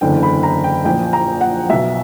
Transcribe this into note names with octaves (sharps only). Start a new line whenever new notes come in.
F#1 E2 D3 G5
B5
A#5
G5
A#1 A#2 G5
A#5
F#5
B1 B2 E5